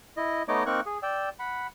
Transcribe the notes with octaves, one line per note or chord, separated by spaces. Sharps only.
E4 D#5
A3 B3 D#4 C#5 D#5 D6
A#3 C4 D#4 A#4 C#6 F#6
G#4
D5 G5 E6
F#5 B5